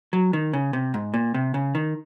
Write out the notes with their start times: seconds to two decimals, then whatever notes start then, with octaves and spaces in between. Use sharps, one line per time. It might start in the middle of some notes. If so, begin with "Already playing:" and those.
0.13 F#3
0.33 D#3
0.53 C#3
0.73 C3
0.94 G#2
1.14 A#2
1.34 C3
1.54 C#3
1.75 D#3